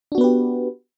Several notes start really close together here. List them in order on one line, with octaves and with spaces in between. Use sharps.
D4 F#4 B3 B4 G4